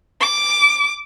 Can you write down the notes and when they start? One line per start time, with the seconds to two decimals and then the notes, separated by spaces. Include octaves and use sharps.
0.21 D6